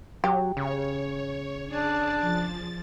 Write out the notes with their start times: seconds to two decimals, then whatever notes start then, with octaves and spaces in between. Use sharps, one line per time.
0.24 F#3 G4
0.57 C#3 C#5
1.67 D4 G#4 D5 A5
2.19 F3 A6